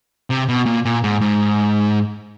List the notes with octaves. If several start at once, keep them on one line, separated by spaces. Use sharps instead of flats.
C3
B2
A#2
A#2
G#2
G#2